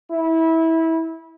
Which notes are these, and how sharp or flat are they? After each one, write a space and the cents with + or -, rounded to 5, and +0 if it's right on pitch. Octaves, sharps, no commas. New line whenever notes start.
E4 -20